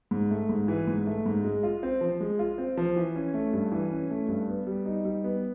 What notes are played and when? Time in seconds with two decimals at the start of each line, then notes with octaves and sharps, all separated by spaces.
0.11 G#2
0.31 A3
0.49 G#2
0.68 E3
0.87 G#2
1.07 A3
1.26 G#2
1.44 G#3
1.63 F4
1.83 C4
2.01 F3
2.20 G#3
2.39 F4
2.58 C4
2.77 F3
2.96 E3
3.16 C#4
3.34 A3
3.53 G2
3.72 E3
3.91 C#4
4.11 A3
4.28 G2
4.48 B3
4.67 G3
4.86 D#4
5.05 G3
5.24 B3